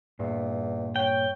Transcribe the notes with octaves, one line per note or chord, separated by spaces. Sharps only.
E2 G2 A#2
C#5 G5